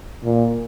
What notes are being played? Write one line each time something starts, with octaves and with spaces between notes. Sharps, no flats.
A#2